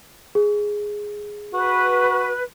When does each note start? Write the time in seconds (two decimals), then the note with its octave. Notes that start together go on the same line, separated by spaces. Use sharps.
0.35 G#4
1.54 F#4 B4